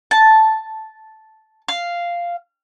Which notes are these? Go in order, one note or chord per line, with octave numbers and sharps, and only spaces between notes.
A5
F5